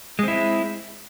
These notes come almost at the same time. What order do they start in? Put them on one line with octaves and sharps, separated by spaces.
G#3 C4 E4